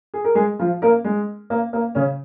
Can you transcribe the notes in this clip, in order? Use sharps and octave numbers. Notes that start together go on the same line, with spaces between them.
G#4
A#4
G#3 G#4
F3 F4
A#3 A#4
G#3
A#3
A#3
C#3 C#4